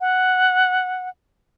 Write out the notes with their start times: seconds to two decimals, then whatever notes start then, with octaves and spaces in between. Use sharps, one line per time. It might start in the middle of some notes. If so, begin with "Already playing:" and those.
0.01 F#5